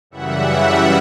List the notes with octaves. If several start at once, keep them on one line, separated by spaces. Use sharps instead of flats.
F#2 C#3 E3 G3 E5 F#5